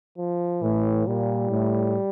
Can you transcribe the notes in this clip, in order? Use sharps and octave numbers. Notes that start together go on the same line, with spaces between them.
F3
A2 E3
A#2 G3
A2